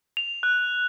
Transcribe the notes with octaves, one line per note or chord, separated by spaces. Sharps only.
F7
F#6